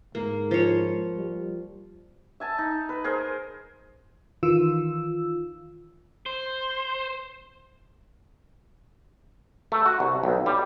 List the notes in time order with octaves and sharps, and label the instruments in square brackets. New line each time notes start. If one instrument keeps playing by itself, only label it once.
[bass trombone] G#2 [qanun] A#3
[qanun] F3 C#5
[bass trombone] G3
[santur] E5 G#5 A5
D#4
B4
G#4 A#4 C5
[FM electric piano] D#3 E3 F4 E6
[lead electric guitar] C5
[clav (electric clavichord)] A3
F#4
C2
B1
G3